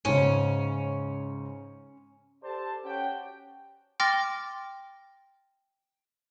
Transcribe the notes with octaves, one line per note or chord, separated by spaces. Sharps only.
G#2 C#3 C#4
G4 A4 C5 D5 A5
C#4 F#4 G4 F#5 G5
G5 C6 D6 F6 A6 A#6